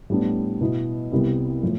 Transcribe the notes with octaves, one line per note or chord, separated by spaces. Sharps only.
A2 G3 B3 D4
B2 B3 E4
C2 C3 G3 B3 E4
A2 F3